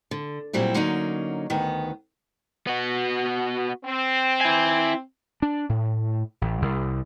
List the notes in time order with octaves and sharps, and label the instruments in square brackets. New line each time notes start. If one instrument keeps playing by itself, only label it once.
[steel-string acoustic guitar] D3
A#2 F#3 G3 C4 E4
D3 F#3 A#3 C#4 D#4
D2 D#3 B3
[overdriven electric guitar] B3 F#4
[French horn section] C4
[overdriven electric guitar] E4 G#5
[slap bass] D4
A2
A1
C2